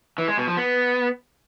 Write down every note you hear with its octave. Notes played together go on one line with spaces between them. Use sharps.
E3
G#3
B2
F3
B3